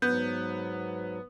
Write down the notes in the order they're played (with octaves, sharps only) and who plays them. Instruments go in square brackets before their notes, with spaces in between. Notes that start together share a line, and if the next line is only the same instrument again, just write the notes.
[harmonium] G#2 F#3 [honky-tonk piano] B3 [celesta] G6